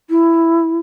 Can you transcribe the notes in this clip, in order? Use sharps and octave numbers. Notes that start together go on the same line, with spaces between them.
E4